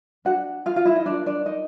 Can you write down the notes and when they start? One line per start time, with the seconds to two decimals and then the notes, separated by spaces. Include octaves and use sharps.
0.25 D4 F#4 F#5
0.66 F4 F5
0.76 F4 F5
0.85 E4 E5
0.95 D#4 D#5
1.06 D4 F4 A#4 D5
1.26 D4 D5
1.46 D#4 D#5